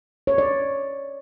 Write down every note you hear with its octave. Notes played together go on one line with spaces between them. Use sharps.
C#5
D5